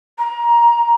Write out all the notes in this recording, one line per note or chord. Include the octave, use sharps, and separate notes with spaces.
A#5